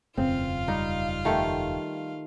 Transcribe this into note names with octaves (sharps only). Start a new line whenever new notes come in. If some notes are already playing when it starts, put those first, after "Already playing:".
E1 F#2 C#3 C4 F4 F5
G3 D#4
D#3 A3 G4